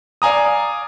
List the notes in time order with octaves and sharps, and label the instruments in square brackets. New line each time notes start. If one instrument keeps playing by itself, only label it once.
[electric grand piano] D5 F5 G#5 A#5 D#6